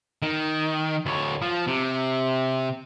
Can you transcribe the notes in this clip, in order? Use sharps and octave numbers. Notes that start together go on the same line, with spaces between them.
D#3
D2 C#5
F3
C3